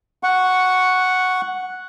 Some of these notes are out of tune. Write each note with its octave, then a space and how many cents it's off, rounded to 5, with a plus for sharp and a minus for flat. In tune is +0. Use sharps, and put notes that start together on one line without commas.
F#5 +0 C#6 +0